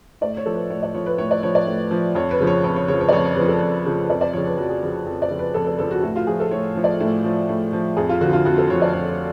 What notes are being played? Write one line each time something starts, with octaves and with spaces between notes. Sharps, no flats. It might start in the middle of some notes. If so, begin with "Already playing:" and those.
A2 D5
C#5
F3 A4
B4
A2 C#5
D5
F3 C#5
B4
A2 C#5
D5
F3 C#5
D5
A2
F3
F2 C#5
B4
C#3 F3
C#5
F2 C#5
C#5
C#3 F3 C#5
C#5
D5
F2 C#5
C#5
C#3 F3 B4
A4
F2
C#3 F3
F2 D5
D5
C#3 F3 C#5
B4
F2 F#4
G#4
C#3 F3
F2
D5
C#3 F3
B4
F2 A4
A4
C#3 F3 A4
F#4
A2 F#4
F4
F3 G#4
A4
A2 C#5
F3
D5
A2
F3
A2
F3
F2 G#4
F4
D3 F3 F#4
F4
F2 F#4
A4
D3 F3 C#5
D5
F2 C#5
C#5